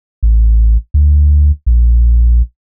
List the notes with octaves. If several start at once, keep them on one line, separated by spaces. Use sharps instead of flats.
A1
D2
A#1